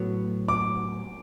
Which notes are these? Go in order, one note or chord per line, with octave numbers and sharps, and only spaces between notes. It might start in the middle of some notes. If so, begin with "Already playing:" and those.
Already playing: A2 F#3 B3
D6